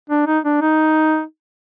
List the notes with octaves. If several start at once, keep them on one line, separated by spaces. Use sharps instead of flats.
D4
D#4
D4
D#4